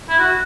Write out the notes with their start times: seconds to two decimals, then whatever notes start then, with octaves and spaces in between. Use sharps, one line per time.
0.09 E4
0.19 F#4